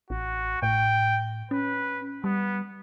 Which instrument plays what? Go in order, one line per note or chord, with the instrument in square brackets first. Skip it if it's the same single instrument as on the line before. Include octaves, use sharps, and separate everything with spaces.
[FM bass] A1 [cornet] F#4
[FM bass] A2 [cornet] G5
[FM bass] C#4 [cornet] B4
[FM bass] G3 [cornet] B3